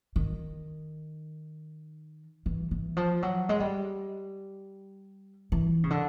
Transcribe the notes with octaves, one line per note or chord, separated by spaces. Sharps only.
D#3
E3
E3
F3
F#3
G#3
G3
E3
C#3
D3